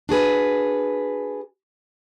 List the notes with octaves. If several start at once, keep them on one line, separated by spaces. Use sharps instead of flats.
D4 F#4 G#4 B4